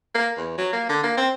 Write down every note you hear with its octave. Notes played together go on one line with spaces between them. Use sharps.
A#3
E2
F#3
A#3
D3
A#3
C4